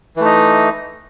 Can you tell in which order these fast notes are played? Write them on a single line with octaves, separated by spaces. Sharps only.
E3 A3 D#4